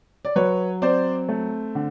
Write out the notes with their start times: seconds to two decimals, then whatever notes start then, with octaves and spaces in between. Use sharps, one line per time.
0.25 D5
0.36 F#3 B4 C#5
0.82 C4 C5 D5
1.29 A3
1.75 D3